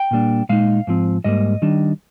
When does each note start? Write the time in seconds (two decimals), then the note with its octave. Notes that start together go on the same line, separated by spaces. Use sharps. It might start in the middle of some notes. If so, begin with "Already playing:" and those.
Already playing: G5
0.11 A#2 G3 A#3 D4
0.49 A#2 G#3 D#4 F5
0.87 G#2 F3 C4
1.24 G#2 G3 A#3 D#5
1.62 D#3 G3 D4